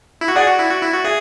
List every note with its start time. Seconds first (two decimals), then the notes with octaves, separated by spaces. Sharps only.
0.21 E4
0.28 F#4
0.36 G#4 D5 F#5
0.47 F#4
0.59 E4
0.70 F#4
0.82 E4
0.93 F#4
1.04 G#4 E5 G#5